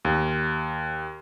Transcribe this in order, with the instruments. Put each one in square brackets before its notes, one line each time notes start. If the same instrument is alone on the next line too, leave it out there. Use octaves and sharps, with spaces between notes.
[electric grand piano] D#2